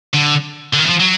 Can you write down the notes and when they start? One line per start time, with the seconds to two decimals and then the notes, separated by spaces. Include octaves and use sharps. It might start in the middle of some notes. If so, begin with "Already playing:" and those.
0.13 D3
0.73 D3
0.78 D#3
0.85 E3
0.89 F3
1.00 F#3